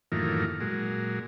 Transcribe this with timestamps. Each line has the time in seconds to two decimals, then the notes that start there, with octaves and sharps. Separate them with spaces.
0.12 F#2 A2 D#3 E3 A#3 F4
0.61 A#2 F#3 G#3